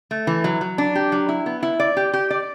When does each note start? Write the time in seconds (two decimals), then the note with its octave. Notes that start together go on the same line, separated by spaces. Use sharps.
0.11 A3
0.27 E3
0.44 F#3
0.61 F#3
0.78 D4
0.95 G4
1.12 F#3
1.29 E4
1.46 B3
1.63 E4
1.80 D5
1.97 G4
2.13 G4
2.30 D5